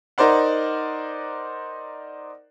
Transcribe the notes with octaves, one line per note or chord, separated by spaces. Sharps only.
D#4 A#4 C5 D5 F#5